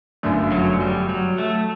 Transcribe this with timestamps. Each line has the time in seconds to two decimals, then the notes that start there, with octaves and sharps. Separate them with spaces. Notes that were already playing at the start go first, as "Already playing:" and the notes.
0.23 G1 F#2 D3 A3
0.52 F#3
0.81 G3
1.09 F#3
1.38 A3